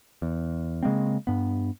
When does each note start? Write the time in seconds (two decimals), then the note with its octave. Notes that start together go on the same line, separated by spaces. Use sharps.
0.22 E2
0.83 C#3 G#3 A#3 C4
1.27 G2 B3